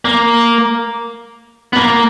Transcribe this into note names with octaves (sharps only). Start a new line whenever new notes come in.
A#3
B3
A#3